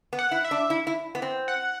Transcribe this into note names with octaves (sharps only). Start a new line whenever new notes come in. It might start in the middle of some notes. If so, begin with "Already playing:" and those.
B3
F#5
E4
E5
D4
E4
E4
B3
C4
F#5